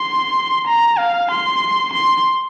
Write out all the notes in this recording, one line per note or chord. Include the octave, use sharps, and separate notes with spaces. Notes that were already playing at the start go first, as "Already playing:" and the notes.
Already playing: C6
A#5
F5
C6
C6